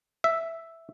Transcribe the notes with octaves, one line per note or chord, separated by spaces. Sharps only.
E5